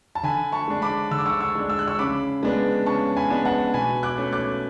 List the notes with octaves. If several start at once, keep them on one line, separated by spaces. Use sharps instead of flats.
A5
D3 G#5 B5
A5 C#6
G#3 D4
B5 D6
D3 E6
D6
C#6 E6
C#6 E6
G#3 D4
E6
F#6
C#6 E6
C#3 B5 D6
G#3 B3 D4
C#3 A5 C#6
G#5 B5
G#3 B3 D4
F#5 A5
B2 G#5 B5
D6 F#6
A3 C#4
D6 F#6